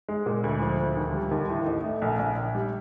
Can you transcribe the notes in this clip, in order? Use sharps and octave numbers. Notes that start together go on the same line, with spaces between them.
G#3
A#2
D2
F3
D2
D#2
G3
D#2
A2
A1
A3
A#1
A#1
A#1
G3